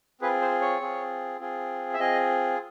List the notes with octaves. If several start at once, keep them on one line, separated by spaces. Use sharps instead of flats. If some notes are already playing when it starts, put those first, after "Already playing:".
C4 F4 G#4 B4
C5
C#5
C4 F4 G#4
C4 F4 G#4
E5
C4 F4 G#4 D#5